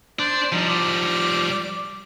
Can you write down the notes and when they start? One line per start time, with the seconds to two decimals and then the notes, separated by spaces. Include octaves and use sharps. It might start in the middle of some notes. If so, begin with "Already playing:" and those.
0.19 D4 C5 D5
0.52 F3 G3 D#4
0.68 D6